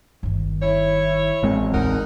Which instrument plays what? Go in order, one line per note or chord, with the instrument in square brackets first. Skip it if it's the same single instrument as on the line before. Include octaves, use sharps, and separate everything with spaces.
[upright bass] G1 D#3
[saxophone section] E4 C#5
[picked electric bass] A1 G#3 C4
[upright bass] D#2 A2 [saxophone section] D#4 A#4 F#5